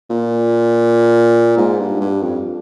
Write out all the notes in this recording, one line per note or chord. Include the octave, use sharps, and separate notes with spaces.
A#2
G#2
G2
G2
F2